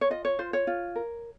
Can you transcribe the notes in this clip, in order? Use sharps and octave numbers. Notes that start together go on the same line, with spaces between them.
C#5
F4 D#5
C#5
F4 C5
C#5
F4
A#4